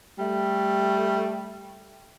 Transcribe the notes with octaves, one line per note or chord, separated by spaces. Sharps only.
G3 A3